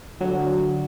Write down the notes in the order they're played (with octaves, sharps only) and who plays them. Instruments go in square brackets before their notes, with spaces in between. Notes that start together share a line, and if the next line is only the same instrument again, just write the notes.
[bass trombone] D3 [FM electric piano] F#3